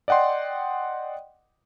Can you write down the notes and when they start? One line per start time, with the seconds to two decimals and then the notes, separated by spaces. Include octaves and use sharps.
0.08 D5 D#5 F#5 G5 C6